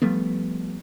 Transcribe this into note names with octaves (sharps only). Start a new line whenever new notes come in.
F3 G3 A3 B3